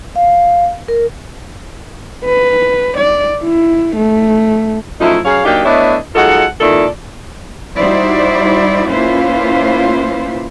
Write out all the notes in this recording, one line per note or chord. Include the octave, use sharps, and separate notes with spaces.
F5
A#4
B4
D5
E4
A3
F#2 F3 A3 D#4 E4
F#2 G#4 C#5 F5
F#3 A#3 D4 D#4 G4
A3 B3 D4 E4 C#5 D#5
F#3 G#3 D#4 F4 A4 F#5
F2 A#2 D#3 E4 A4 D5
G3 D#4 E4 F#4 C5 D5
A#3 C#4 E4 F4 B4 C5